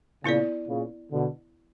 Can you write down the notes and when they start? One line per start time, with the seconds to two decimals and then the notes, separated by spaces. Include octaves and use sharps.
0.24 A#2 C#3 B3 E4 A#4 D5
0.68 A#2 C#3
1.12 B2 D3